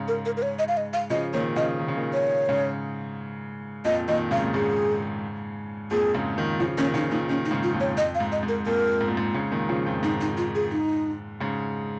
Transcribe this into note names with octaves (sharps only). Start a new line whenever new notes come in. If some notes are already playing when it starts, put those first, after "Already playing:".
Already playing: G#2 C#3
A#4
A#4
A#4
C#5
D#5
F5
D#5
F5
C#3 F3 D#5
A#2 D#3 C#5
C#3 F3 D#5
D#3
C#3
A#2 D#3
C#5
G#2 C#3
F2 A#2 D#5
A#2 D#3 D#5
G#2 C#3 F5
A#2
G#2 C#3 G#4
F2 A#2 G#4
G#2 C#3
A#2 D#3
C#3 F3 F4
A#2 D#3 C#4
C#3 F3 D#4
A#2 D#3 D#4
A#2 D#3 C#4
D#4
G#2 C#3
F4
F2 A#2
C#5
F2 D#5
F5
G#2
D#5
G#2
A#4
F2 A#2 A#4
G#2
A#2
G#2
G#2 C#3
A#2 D#3
C#3 F3
F2
G#2 D#4
D#4
F4
G#4
D#4
G#2 C#3